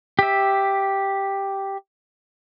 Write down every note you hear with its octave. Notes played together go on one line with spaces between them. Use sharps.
G4 E5